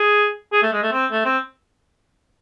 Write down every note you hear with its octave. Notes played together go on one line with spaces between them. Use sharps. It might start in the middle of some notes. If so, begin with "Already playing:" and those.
Already playing: G#4
G#4
A3
G#3
A3
C4
A3
C4